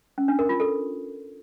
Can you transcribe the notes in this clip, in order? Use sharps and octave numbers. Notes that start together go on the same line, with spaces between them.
C#4
D4
A#4
F4
A4